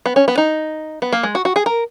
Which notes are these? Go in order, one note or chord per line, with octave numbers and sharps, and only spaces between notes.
B3
C#4
B3
D#4
B3
A#3
G#3
F#4
F#4
G#4
A#4